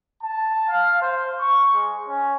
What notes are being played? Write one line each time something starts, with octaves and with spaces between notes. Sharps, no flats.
A5
F5
C5
C#6
G#3
C#4